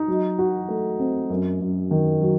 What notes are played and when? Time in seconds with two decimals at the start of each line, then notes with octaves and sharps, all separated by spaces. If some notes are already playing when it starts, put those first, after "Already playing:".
Already playing: D#4
0.08 F#3
0.39 F#4
0.68 A3
0.99 C4
1.30 F#2
1.61 F#2
1.91 D#3
2.21 F#3